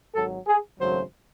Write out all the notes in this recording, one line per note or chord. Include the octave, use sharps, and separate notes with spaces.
G#1 G#2 F#3 A4
G#4
G#1 F#2 C#3 F#3 A3 C5